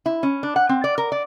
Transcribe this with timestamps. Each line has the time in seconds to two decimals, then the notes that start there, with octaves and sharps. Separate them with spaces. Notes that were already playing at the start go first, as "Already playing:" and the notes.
0.06 E4
0.23 C#4
0.43 D4
0.56 F#5
0.69 C4
0.84 D5
0.98 A#4
1.12 D5